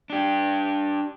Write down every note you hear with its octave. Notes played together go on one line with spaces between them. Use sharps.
D4 G4